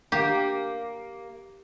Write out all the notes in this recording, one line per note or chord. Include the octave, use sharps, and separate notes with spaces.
A#3 G4